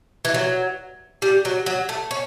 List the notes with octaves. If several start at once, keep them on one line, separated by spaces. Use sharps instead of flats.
E3
F#3
G3
F#3
F#3
A3
C#4